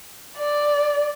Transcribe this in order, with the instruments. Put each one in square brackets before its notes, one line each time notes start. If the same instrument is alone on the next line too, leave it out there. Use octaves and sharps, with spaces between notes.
[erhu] D5